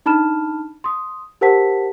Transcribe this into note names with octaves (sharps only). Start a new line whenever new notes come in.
D4 D#4 A5 B5 F6 E7
C6 D#6
G4 A#4 C5 F#5 A5 B6